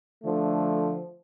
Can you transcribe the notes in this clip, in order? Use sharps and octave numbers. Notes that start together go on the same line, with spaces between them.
D3 F3 A3